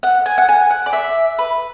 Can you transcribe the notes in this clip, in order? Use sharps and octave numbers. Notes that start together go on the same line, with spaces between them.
F#5
G#5
F#5
G#5
F#5
D5
E5
B4